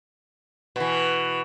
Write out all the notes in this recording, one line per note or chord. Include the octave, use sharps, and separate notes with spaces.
B2 E3